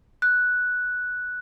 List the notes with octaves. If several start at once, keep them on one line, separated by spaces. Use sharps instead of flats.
F#6